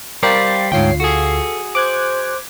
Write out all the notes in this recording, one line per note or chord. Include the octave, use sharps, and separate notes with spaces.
G3 A#4 C5 D5 F5 G5
D2 G#2 F4 C#5 G5 C7
F#4 G#4 A4
C5 D6 F#6 G#6